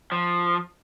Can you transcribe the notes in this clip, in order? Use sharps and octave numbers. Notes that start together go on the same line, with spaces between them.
F3